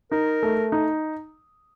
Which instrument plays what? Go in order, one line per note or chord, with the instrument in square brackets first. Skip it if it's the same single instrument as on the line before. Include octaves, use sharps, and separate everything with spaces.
[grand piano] D#4 [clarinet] A#4
[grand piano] A3
D#4